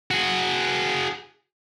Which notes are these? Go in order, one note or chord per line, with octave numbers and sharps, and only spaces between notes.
F#4 G#4